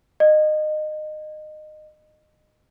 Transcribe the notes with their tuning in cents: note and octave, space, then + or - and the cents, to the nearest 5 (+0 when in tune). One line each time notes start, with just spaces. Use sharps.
D#5 -20